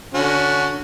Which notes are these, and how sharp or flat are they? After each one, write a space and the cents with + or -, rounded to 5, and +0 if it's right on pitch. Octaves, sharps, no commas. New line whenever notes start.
D3 +0 C#4 +20 F#4 +0